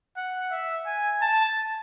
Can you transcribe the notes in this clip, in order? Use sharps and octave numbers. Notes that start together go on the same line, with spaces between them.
F#5
E5
G#5
A5